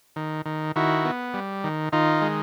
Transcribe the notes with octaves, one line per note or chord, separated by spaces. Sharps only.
D#3
D#3
D#3 E4 F#4
B3
G3
D#3
D#3 D#4 F4
G#3